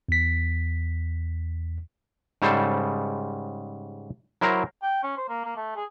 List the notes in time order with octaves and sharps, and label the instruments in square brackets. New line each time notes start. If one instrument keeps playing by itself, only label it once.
[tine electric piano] E2 B6
[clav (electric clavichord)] G#2 C#3 G3 A4 C5
F#3 E4 A#4 C5 A#5
[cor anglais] G5
C#4
C5
A#3
A#3
A3
G#4